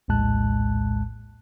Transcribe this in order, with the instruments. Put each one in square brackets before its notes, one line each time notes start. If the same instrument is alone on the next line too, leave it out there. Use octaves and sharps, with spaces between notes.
[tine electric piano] A#1 D#2 A2 G#3 A5 F#6